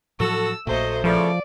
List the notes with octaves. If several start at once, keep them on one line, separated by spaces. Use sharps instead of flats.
A2 F3 F#3 F#4 A4 E6
A#1 A#2 F#3 A3 C5 D#5
C#3 E3 F3 A3 D5